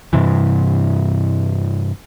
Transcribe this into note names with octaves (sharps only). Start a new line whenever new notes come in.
G2 C3 E3